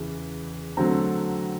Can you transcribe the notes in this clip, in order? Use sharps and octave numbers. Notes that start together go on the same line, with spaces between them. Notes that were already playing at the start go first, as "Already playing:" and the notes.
Already playing: E2 C#3 E3
D3 F#3 A3 C4 A#5